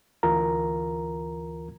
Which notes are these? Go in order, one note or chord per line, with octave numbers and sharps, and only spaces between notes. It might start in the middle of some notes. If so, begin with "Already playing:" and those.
D2 E3 F4 A#4 A#5